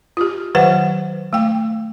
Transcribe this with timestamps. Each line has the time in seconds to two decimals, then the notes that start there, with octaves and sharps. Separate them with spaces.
0.17 F4 G4
0.55 D#3 F#3 B4 C5 F#5
1.33 A3 G5